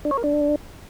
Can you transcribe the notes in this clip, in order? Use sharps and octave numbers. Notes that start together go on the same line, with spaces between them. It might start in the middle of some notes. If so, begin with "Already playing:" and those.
D4
C#5
A#4
D4